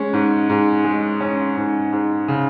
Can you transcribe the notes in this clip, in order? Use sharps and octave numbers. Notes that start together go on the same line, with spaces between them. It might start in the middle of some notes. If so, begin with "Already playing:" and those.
Already playing: G#3 C#4
G#2
G#2
G#3
C#4
G#2
G#2
C#3